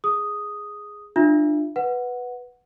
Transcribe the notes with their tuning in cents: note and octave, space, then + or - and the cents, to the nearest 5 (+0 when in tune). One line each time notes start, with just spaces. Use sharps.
G#4 +0 D#6 +0
D4 +30 F4 +0 E5 +30
B4 +0 F#5 -5